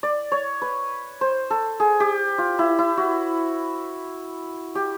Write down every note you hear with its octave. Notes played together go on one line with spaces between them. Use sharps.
D5
C#5
B4
C5
A4
G#4
G4
F4
E4
E4
F#4
G4